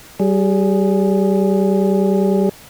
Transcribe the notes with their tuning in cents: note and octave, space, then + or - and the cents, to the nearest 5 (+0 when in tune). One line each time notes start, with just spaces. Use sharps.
G3 -30 G#4 +0